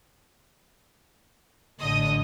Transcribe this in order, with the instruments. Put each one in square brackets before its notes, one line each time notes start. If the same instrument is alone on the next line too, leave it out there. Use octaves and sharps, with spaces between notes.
[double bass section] A1 D3 [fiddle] D#5 D#6